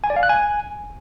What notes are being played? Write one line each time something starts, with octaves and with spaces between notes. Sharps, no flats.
G#5
D5
F5
F#6
G#5